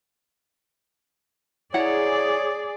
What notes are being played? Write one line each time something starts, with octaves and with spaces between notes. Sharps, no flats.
E4 G#4 C#5 D5 F#5 A#5